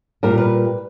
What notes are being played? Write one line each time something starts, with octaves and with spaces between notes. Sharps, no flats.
A#2 G3 A#4
B4